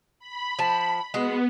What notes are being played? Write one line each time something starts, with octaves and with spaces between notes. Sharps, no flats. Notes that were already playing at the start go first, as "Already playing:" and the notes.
B5
F3 A5
G#3 B3 F#4